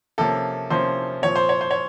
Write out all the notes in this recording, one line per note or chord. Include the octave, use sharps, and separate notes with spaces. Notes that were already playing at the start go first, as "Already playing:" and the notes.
C3 F3 A#3 C#4 A4
C3 F3 A#3 C#4 C5
A#2 F3 C4 C#5
C5
C#5
C5
C#5